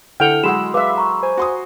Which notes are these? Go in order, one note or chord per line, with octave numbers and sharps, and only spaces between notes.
D3 E4 A4 F#5 G5 F6 F7
F#3 G#3 G#4 F#5 B5 C6 E6 E7
B4 E5 F5 D6
A#5 C#6
C5 G#5
F#4 C6 D#6